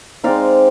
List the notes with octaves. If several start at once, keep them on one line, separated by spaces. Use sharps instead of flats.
G#3 C4 D#4 D5 F5